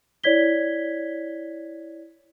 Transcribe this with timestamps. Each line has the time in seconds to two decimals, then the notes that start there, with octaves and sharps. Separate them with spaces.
0.24 E4 C#5 D5 G#6 B6 G7